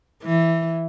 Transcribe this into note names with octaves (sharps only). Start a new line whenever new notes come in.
E3